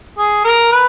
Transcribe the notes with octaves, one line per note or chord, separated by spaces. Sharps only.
G#4
A#4
B4